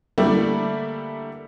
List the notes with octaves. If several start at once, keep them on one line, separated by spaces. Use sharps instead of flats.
D3 G3 A3 A#3 D4 E4